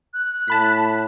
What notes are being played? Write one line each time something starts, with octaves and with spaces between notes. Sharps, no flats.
F#6
A2 A5 B5 B6